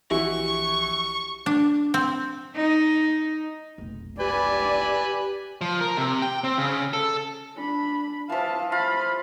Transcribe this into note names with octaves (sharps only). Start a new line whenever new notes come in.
A#1 E3 E4 F#4 G4 C#6
D4
C4
D#4
F1 B1
G4 B4 D5 G#5
F3
A#4
C3
G5
C4
C#3
A4
D4 B5
E3 F3 F5 A5
F4 F5 A5 B5